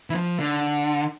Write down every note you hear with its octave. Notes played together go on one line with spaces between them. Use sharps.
E3
F3
D3